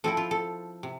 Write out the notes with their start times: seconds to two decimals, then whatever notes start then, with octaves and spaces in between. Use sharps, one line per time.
0.04 F3 C4 E4 A4
0.17 F4
0.31 A4
0.83 C3